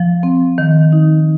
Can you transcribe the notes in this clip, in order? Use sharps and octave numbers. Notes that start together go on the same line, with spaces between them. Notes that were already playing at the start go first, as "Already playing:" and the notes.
Already playing: F3
C4
D#3
D#4